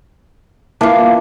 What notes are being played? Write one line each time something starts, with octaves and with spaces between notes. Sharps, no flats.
E3 A#3 B3 D4 F4